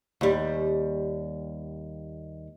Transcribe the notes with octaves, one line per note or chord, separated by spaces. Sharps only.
D#2 G3